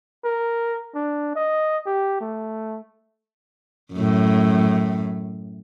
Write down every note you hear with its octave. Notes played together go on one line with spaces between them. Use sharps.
A#4
D4
D#5
G4
A3
F#2 A2